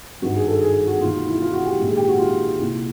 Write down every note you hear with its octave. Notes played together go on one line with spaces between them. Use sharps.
G#1 G2 D#3 F#4
G#4
A4
G#4
F#4
E1 D#2 D#3 F4
F#4
E4
F4
F#4
G4
A#1 G#2 D#3
G#4
G4
F#4
F4
C2 A#2